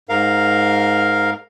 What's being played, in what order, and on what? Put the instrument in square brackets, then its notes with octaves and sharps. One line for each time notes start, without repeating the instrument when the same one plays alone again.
[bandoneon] G#2 A#4 F5